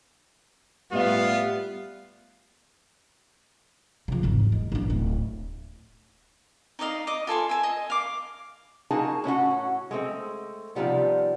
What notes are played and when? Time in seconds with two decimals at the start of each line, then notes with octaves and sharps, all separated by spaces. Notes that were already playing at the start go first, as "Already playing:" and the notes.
0.92 A2 G3 B3 F4 B4 E5
4.08 C#3 F3
4.23 G#1 E2
4.52 G#3
4.72 A1 D4
4.90 D1
6.79 D#4 D5 D#5 F5
7.07 D#5 D6
7.27 F4 A4 G#5 C6
7.49 E5 G#5
7.63 D#5
7.90 F5 D6
8.91 A#3 D#4 F#4 G#4 G#5 A5
9.24 A2 C#4 E4 F#4
9.91 G#3 A3 C4
10.75 C3 D#3 F3 G3 B3